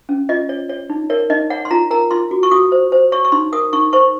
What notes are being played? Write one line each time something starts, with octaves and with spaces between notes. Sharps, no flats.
C#4
F4 D#5
C#5
C#5
D#4
A#4 C#5
D#4 D#5
C#5 F#5
C6
F4 A#5
A#4 A#5
F4 C6
F#4
C#6
F#4 D#6
C5
C5
C#5 C#6
C#6
D#4 C6
A#4 D#6
D#4 C#6
C5 C#6